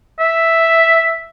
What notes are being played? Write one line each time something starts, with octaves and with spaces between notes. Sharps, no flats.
E5